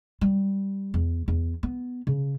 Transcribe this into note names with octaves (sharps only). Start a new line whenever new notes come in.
G3
E2
E2
B3
C#3